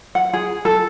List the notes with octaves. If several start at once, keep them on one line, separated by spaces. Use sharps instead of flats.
F#5
G#4
A4